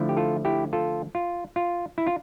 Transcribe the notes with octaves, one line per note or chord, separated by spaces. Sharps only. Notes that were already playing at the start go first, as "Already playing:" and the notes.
Already playing: D3 F3 A3 E4
G4
F4 A4
E4 G4
F4 A4
F4
F4
E4
F4